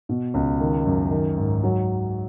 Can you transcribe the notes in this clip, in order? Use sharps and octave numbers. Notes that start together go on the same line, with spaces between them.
B2
C#2
D#3
F#2
D#3
G#2
F#3